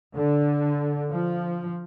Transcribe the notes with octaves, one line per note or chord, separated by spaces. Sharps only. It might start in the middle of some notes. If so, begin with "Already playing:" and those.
D3
F3